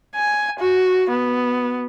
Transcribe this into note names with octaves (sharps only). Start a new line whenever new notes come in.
G#5
F#4
B3